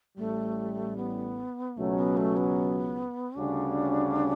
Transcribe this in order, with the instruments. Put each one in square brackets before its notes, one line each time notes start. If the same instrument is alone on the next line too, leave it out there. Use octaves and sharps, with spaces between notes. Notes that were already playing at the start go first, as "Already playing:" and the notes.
[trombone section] A1 A2 G3 [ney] A3
[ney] B3
[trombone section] C#2 B2 F#3 C#4 [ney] A3
[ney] B3
A3
B3
[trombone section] D2 C#3 G3 C#4 F#4 [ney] D4